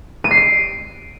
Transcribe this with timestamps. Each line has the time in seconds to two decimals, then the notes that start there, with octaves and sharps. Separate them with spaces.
0.24 D#7
0.31 C7
0.37 D7